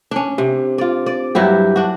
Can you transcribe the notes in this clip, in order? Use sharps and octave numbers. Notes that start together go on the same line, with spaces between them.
C#4 D4
C3
F4 D5
D5
G2 F#3 E4 G4
D4 F#4